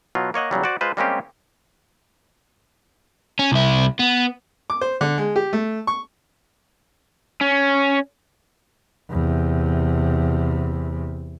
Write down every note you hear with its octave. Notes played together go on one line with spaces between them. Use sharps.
B2 F#3 F4
A#3 C#5 D#5 F#5
E2 C#3 F#3 G3
F#4 C5 D5
G#3 F4 B4 C5
G3 G#3 A#3 C4 C#4 G4
C#4
C2 E4
B3
D6
C5
D3
G#3
G4
A3
C#6
C#4
E2 C3